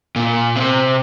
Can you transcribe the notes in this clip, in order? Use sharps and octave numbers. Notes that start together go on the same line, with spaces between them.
A#2
C3